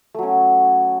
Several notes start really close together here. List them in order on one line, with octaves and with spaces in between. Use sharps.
A3 F#3 C#4